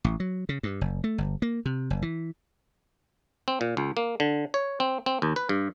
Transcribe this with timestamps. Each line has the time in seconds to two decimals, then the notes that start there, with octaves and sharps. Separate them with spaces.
0.04 A1
0.20 F#3
0.49 C#3
0.63 G2
0.81 F#1
1.04 A3
1.18 G1
1.42 A#3
1.66 C3
1.90 F#1
2.02 E3
3.48 C4
3.61 A#2
3.77 C#2
3.97 A#3
4.20 D3
4.54 C#5
4.80 C4
5.06 C4
5.22 D#2
5.36 B4
5.49 G2